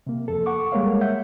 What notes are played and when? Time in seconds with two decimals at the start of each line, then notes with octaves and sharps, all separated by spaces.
0.07 C3 A#3
0.28 F2 A4
0.46 A4 F#5 C#6 D6
0.72 G3 G#3 A#3 A#4 C#5 F5
1.01 E5 F#5 G6